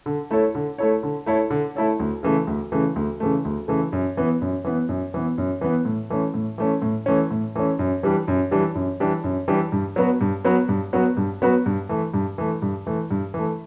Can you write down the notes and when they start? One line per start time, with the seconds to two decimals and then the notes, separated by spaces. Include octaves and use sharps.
0.06 D3
0.31 A3 E4 A4 C#5
0.55 D3
0.78 A3 E4 A4 C#5
1.03 D3
1.26 A3 E4 A4 C#5
1.50 D3
1.76 A3 E4 A4 C#5
2.00 D2
2.23 C#3 E3 A3
2.47 D2
2.72 C#3 E3 A3
2.96 D2
3.20 C#3 E3 A3
3.45 D2
3.68 C#3 E3 A3
3.92 F#2
4.17 E3 B3
4.41 F#2
4.64 E3 B3
4.89 F#2
5.14 E3 B3
5.38 F#2
5.61 E3 B3
5.85 A2
6.10 E3 A3 C#4
6.34 A2
6.58 E3 A3 C#4
6.82 A2
7.06 E3 A3 C#4
7.31 A2
7.55 E3 A3 C#4
7.79 F#2
8.03 E3 G3 D4 G4
8.28 F#2
8.51 E3 G3 D4 G4
8.75 F#2
9.00 E3 G3 D4 G4
9.24 F#2
9.48 E3 G3 D4 G4
9.72 G2
9.96 F#3 B3 F#4 B4
10.21 G2
10.44 F#3 B3 F#4 B4
10.69 G2
10.93 F#3 B3 F#4 B4
11.17 G2
11.42 F#3 B3 F#4 B4
11.66 G2
11.89 E3 A3
12.14 G2
12.38 E3 A3
12.62 G2
12.86 E3 A3
13.11 G2
13.34 E3 A3